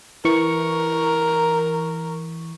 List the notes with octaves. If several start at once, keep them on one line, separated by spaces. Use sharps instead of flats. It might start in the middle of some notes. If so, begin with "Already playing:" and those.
E3 A#4 C#6